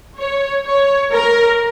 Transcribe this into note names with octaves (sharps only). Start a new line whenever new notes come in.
C#5
C#5
A#4